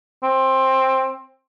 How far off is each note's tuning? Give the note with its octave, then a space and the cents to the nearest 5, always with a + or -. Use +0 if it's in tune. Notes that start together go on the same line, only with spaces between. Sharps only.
C4 +15